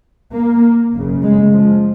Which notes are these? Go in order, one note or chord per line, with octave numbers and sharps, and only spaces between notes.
A#3
F#1 F#2 C#3
G#3
F3